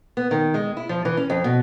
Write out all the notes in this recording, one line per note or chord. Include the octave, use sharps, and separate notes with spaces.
B3
D#3
G#3
E4
F3
E3
C#4
F2
B2